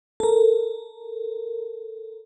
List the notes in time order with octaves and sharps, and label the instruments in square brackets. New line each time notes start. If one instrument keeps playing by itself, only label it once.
[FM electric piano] A4 A#4